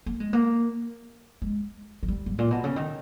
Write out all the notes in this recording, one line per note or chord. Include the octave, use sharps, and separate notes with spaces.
A#3
G#3
A#3
G#3
E3
G3
G#2
A#2
B2
C#3
D#3